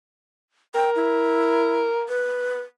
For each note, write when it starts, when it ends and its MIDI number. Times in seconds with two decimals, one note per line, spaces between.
0.75 2.05 70
0.75 0.90 79
0.96 1.82 64
2.08 2.61 71